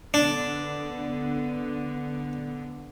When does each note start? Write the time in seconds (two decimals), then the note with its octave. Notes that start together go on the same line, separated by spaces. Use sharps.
0.14 D3 B3 D4